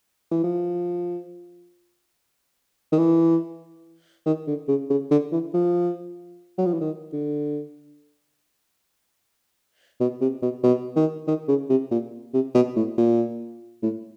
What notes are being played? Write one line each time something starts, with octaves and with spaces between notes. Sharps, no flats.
E3
F3
D#3
E3
D#3
D3
C#3
C#3
D3
E3
F3
F#3
F3
E3
D#3
D3
B2
C3
B2
B2
D#3
D#3
C#3
C3
A#2
C3
B2
A2
A#2
A2